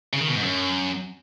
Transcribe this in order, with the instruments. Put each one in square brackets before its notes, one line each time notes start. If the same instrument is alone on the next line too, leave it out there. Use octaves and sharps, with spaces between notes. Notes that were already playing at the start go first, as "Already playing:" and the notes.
[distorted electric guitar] C#3
D#3
B2
G#2
F#2